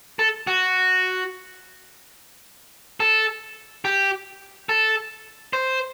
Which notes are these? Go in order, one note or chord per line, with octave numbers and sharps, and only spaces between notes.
A4
F#4
A4
G4
A4
C5